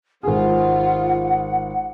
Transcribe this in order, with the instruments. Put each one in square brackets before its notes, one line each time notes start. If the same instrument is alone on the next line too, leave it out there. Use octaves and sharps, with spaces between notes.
[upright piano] G#1 G#4 [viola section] F4 [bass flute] F#5